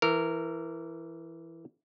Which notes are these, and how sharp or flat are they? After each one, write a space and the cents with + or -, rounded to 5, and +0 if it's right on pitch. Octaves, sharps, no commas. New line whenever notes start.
E3 +10 A#4 -15